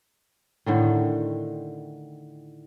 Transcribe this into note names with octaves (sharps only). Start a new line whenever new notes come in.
A2 D3 D#3